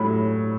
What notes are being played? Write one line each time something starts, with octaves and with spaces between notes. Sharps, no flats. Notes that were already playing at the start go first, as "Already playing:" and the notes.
Already playing: A2 F#3 B5